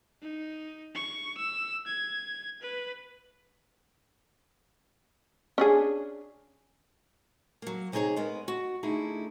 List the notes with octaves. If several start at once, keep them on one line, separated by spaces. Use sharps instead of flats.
D#4
C#6
E6
G#6
B4
C#4 D4 G#4
F#3 A#3
C3 D#4 G4 G#4 C#5 A#5
G#3 B3 A#4
F#4
D3 A3 D#4 E4 G#4